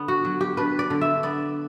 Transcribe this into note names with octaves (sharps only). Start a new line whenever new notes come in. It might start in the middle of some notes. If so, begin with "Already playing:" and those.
Already playing: D3 B3
F#4
F#3
G4
D4 B4
D5
D3
E5
B3 D5